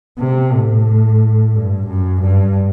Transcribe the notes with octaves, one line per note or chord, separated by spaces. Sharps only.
C3
A2
G2
F#2
G2